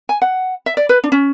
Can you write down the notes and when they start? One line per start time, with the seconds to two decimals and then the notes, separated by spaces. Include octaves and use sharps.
0.09 G#5
0.22 F#5
0.66 E5
0.77 D5
0.89 B4
1.04 D4
1.12 C#4